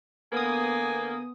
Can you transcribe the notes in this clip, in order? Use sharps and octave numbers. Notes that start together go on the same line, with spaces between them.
D3 A#3 B3 G#5 D#6